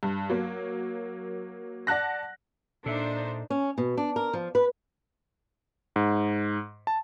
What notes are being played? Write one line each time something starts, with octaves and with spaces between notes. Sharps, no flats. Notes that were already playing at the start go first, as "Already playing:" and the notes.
G2
F#3 A#3
D5 F#5 A5 F#6 A#6
A#2 D4 D#4 A4 C5 E5
C#4
B2
D4
A#4
F3
B4
G#2
A5